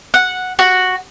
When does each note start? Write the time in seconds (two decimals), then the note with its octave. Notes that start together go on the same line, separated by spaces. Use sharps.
0.14 F#5
0.59 F#4